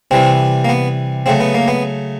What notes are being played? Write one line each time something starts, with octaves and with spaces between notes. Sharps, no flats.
C3 E3 G3 C4
A#3
B3
C#3 F#3 A3 C4
B3
A#3
B3